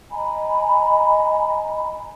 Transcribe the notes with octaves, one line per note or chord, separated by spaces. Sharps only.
D#5 G#5 A#5 B5